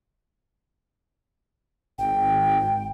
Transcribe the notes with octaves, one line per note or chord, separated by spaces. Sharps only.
G#1 G5